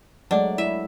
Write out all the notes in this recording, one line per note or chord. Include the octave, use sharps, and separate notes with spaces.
F#3 G#3 A3 D4 D5 D#5 F#5
E4 E5